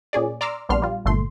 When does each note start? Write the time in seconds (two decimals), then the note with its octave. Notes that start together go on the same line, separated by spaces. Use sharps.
0.13 A#2 C#4 G#4 D5
0.41 D5 A#5 C6 D6 E6 F6
0.69 A#1 G3 B3 D4 C6 F6
0.82 G3 F4
1.05 G1 A#2 A3 C6